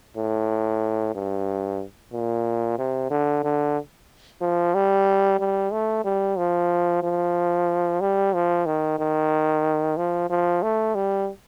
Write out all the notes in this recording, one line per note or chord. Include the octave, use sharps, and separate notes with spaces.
A2
G2
A#2
C3
D3
D3
F3
G3
G3
A3
G3
F3
F3
G3
F3
D#3
D#3
F3
F3
A3
G3